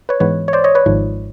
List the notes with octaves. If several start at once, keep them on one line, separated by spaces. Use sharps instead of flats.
B4 C#5
G#2 E3 G#3 B3 B4 C#5
C#5
C5 D5
C#5 D#5
B4 C#5
G#1 G#2 F3